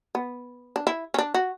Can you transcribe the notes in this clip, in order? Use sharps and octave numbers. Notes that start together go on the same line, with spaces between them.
B3
D4
E4
C#4
D4
F#4